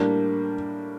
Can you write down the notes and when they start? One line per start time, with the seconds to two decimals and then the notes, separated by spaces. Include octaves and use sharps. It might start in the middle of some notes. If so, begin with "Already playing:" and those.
Already playing: A2 G3 A#3 D4